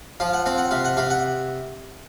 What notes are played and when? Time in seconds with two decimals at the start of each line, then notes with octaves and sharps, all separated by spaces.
0.20 F3 F5
0.33 F#5
0.46 C4 F5
0.58 F#5
0.71 C3 F5
0.85 F#5
0.97 C3 F5
1.10 F#5